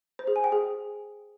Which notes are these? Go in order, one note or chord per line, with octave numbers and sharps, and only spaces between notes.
C5
G#4
G#5
G5
G#4